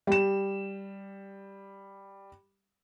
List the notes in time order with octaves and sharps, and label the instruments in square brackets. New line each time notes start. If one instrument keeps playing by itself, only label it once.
[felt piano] G3 E7